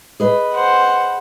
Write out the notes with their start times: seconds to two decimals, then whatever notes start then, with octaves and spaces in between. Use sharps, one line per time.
0.20 G#4 B4 D#5
0.53 C5 F#5